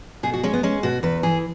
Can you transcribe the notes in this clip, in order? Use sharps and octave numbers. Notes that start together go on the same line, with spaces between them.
B2 G#4
F#4
G#3 C#4
B3
G#3 C#4
B2 F#4
E2 B4
E3 G#4